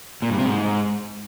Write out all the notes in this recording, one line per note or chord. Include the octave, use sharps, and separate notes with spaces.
A#2
G2
C3
G#2